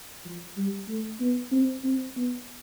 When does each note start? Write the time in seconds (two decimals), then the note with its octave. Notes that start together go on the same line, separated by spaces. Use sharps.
0.25 F3
0.57 G3
0.88 A3
1.21 B3
1.52 C4
1.84 C4
2.16 B3